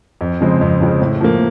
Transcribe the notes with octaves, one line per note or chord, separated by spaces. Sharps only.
F2
C#3 F3 G#3 C4
F2
C#3 F3 G#3 C4
A2
F3 A#3